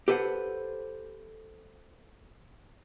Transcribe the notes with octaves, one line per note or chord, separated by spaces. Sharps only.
G4 A4 B4 C5 F#5